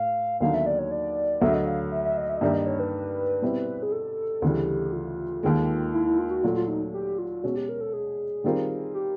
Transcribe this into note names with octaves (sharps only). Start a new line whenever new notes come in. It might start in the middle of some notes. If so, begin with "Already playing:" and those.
Already playing: A2 F5
D#2 D3 F#3 B3 D#4 F5
E5
D5
C#5
D5
D2 D3 F#3 E5
D#5
F5
E5
E5
D#5
E5
D#5
G2 D#3 G3 A#3 D#4 E5
D#5
C#5
B4
B2 G3 C4 E4
G#4
A4
D2 C#3 E3 G3 G4
F4
D#2 D#3 G#3
E4
E4
F4
F#4
A#2 F#3 A3 F4
F4
D#4
G4
F4
B2 G#3 C#4 F#4
G4
A#4
A4
G#4
D#3 G3 C4 F4 A#4
G4